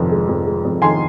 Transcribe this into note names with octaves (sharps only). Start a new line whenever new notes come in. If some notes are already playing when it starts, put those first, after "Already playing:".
Already playing: F1 F2 D#3
G#3
F2
G#3
F2
D#3 G#5 C6